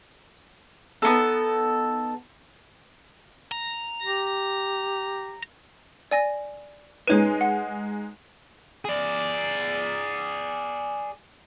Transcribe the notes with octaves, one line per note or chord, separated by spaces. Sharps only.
B3 C#4 D#4 A4
A#5
G4
D5 G#5 A#6
G#3 D#4 B4 C#5 D#7
F#5
G#4 D5